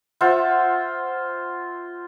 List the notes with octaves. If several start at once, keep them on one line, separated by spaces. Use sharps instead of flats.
F4 C5 E5 F#5